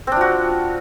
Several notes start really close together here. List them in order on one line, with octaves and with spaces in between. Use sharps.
C4 D4 F4 F#4